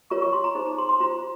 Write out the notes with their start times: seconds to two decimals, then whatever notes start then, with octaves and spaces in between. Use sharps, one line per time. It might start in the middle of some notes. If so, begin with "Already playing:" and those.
0.10 F4 A#4 C#5 C#6
0.22 C#6
0.33 C6
0.44 A#5
0.55 D#4 G#4 C5
0.66 A#5
0.78 C6
0.89 C6
1.00 F4 C5 A#5